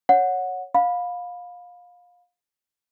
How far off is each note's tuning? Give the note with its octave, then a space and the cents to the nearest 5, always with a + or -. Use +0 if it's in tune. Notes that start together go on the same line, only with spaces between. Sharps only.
C#5 +0 F#5 -15
F5 +25 B5 +0